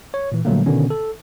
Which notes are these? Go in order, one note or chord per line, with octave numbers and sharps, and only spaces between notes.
C#5
A#2 E3
A#2 D3 F#3 G3 A3 A#3
B2 D3 D#3 B3 C#4
A4